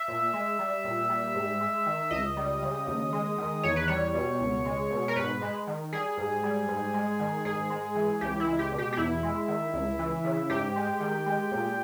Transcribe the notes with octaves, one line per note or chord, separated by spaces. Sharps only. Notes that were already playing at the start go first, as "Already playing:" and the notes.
Already playing: E5
A#2
G#3
G3
A#2
G3
G#2
G#3
D#3
C#2 D#5
G3
C#3
D#2
G#3
D#3
E2 C#5
B4
G3 C#5
B2
C#2
G#3
B2
A#4
G#2 B4
G#3
D#3
G3 G#4
G#2
G3
G#2
G#3
D#3
G#2 G#4
G#3
E3
C#2 G4
E4
G#3
G4
B2
G4
G4
E2 E4
G#3
D#3
C#2
E3
C#3
G#2 G4
G#3
D#3
G#3
A#2